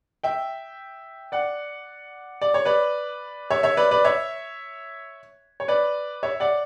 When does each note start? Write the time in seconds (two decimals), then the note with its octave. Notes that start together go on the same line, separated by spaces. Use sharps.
0.24 E5 G5
1.32 D5 F#5
2.42 D5
2.54 C#5
2.65 B4 D5
3.50 C#5 E5
3.63 C#5 E5
3.77 B4 D5
3.91 B4 D5
4.05 C#5 E5
5.60 C#5
5.68 B4 D5
6.23 C#5 E5
6.40 D5 F#5